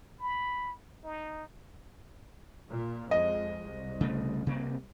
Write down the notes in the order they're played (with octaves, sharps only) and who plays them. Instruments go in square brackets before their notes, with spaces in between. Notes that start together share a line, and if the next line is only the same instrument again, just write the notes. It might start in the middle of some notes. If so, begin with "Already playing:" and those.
[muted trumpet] B5
D#4
[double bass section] A#2
[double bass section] F2 G#3 [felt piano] D#5
[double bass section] C2
[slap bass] C#3 A3
C3 A#3 C4